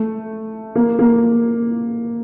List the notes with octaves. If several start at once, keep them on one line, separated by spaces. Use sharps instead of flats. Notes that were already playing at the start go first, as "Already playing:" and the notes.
Already playing: A3
A#3
A#3